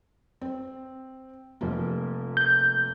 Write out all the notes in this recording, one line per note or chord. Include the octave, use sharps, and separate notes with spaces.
C4
F1 F3 A#3
G6